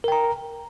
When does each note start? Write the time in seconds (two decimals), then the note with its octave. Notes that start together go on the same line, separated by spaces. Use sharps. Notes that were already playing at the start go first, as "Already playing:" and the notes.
0.04 A#4
0.08 G5
0.12 A#5